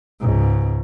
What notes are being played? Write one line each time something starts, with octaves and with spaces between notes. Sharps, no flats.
C#2 G#2